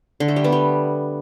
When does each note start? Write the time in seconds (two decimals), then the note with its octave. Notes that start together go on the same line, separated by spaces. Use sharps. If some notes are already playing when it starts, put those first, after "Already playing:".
0.20 D3
0.28 A3
0.36 G3
0.44 B3
0.52 G3